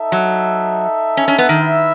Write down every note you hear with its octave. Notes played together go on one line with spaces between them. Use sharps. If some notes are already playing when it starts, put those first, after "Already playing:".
Already playing: D#4 A4 E5
F#3
C#4
C#4
B3
D#3
E4 B4 E5